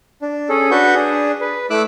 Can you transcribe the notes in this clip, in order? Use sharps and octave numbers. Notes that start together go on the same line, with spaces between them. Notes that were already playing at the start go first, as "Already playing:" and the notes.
D4
C#4 G#4 A4
D4 F#4 B4 F#5 C#6 G6
D4 G#4
B4
A3 E4 D6 E6 F#6